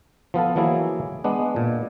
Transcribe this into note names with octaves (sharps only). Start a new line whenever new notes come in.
F3 B3 F4 A4
E3 F#3 A#3 E4 G#4
G#3 B3 D4
A#2